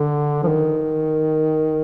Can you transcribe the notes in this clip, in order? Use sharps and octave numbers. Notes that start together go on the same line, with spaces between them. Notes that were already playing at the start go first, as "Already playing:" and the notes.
Already playing: D3
F3
D#3